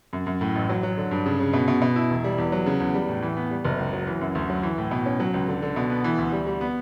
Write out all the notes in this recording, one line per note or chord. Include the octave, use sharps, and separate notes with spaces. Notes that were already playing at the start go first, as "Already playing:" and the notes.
F#2
F#2
A2
A1
F#3
F#3
D3
G2
C#3
C#3
B2
B2
B2
E4
E1
G3
E2
F#3
C#3
E2
G3
A2
E3
B3
G3
F#1
C#2
F#3
E3
F#2
D2
F#3
E3
A2
B2
C#4
F#3
C#2
D3
D3
B2
B3
E3
D2
G3
G3
B3